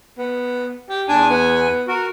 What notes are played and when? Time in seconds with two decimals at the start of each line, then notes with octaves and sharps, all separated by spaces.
0.18 B3
0.89 G4
1.08 E2 D4 G#5
1.29 B3
1.87 F#4 A#4